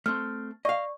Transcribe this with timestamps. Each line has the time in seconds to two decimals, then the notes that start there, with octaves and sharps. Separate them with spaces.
0.06 A3 C4 F6
0.65 D5 D#5 F5 C#6